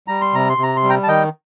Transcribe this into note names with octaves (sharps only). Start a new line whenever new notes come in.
G3 A#5
C6
C3 A#5
C6
C3
A#5
C6
G3
G5 A#5
A5
D#3 D#5 G5